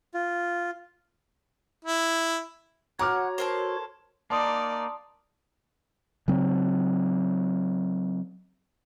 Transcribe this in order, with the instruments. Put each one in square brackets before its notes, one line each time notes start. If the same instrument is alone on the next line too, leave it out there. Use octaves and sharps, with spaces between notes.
[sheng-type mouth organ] F4
[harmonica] E4
[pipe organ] F#4 C#5 [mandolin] F#5 [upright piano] A#5 D6 F6
[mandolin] A4 A#4 C5
[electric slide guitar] A#3 D#4 [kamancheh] D5 [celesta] A5 C6 D#6
[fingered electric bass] C#3 F#3 C4